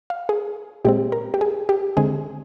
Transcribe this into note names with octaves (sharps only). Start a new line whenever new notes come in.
F5
G#4
A#2 G#3 C4 G4
A#4
G4
G#4
G4
D3 G#3 C4 G#4